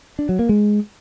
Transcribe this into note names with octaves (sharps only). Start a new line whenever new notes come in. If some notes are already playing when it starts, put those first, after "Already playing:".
D4
F#3
A#3
G#3